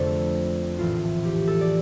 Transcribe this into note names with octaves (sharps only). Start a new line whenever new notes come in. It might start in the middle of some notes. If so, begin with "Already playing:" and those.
Already playing: F2 D3 A3 A4 C5 D5
A#1 A2 E3 F4
G4
A4
D5